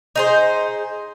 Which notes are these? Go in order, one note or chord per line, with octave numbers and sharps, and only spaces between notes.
D#4 G#4 C5